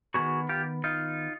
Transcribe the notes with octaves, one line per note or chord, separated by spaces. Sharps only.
D#3 G3 B3 F#4 G#4
F4 G4
D#4 F4